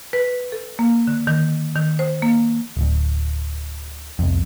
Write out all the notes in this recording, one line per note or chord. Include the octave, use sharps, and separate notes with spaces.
B4
A4
A#3
D3
D#3
D#3
C5
A#3
D1 D2
C2 F2